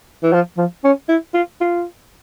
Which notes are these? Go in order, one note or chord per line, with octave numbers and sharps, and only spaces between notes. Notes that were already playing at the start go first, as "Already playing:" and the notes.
E3
F3
F3
C#4
E4
F4
F4